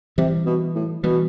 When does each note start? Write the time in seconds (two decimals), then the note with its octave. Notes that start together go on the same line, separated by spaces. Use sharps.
0.18 C3 E3 G3
0.46 B2
0.75 A2
1.03 B2 E3 G3